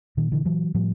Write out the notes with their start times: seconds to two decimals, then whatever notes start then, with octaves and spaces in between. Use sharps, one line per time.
0.17 A#2 D#3
0.32 D3 E3
0.45 E3 F#3
0.75 A2 F3 G3